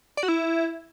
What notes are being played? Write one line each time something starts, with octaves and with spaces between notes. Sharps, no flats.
D5
F#4
E4